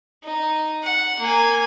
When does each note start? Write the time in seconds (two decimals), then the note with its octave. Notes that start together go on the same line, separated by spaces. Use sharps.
0.24 D#4
0.84 F#5
1.20 A#3 G#5